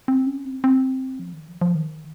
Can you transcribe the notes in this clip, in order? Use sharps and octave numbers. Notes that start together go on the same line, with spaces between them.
C4
C#4
C4
C4
F3
D#3
F3
F3
D#3